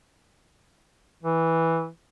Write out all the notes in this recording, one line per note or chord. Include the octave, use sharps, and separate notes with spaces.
E3